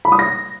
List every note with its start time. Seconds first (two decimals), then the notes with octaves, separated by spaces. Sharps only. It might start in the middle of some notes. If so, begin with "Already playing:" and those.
0.05 B5
0.12 D#6
0.19 A#6